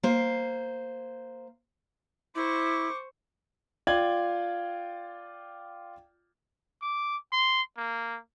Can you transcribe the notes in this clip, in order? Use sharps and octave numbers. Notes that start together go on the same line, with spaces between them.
A#3 C5
E4 C5 C#6 D6
F4 D5 G5 G#6 F#7
D6
C6
A#3